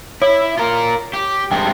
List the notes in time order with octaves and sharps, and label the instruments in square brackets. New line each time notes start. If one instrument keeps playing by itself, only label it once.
[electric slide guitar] E4 [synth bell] C#5
[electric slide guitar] F4 A#4
G4
[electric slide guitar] G2 G#3 C4 [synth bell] G5